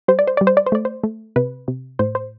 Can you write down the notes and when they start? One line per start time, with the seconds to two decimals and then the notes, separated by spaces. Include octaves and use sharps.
0.08 G3 C5
0.19 D5
0.27 C5
0.37 G3 D5
0.47 C5
0.57 D5
0.66 C5
0.72 A3 D5
0.85 C5
1.04 A3
1.36 C3 B4
1.68 C3
1.99 A2 C5
2.15 C5